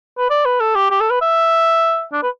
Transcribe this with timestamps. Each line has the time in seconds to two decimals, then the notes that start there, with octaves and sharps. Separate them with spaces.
0.18 B4
0.30 D5
0.45 B4
0.60 A4
0.75 G4
0.91 G4
1.01 A4
1.10 B4
1.22 E5
2.13 D4
2.23 B4